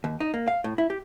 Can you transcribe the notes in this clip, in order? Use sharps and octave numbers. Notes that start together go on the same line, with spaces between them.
D#2
D#4
A#3
F5
A2
E4
G4